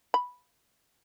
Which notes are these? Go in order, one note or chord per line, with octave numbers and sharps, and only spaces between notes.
B5